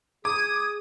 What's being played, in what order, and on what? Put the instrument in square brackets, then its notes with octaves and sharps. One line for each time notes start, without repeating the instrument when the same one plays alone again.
[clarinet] G#4 [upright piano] D6 [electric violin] D#6 [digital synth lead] G#6